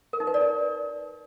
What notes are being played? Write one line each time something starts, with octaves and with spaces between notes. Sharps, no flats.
A#4
D#4
B4
D5
A#4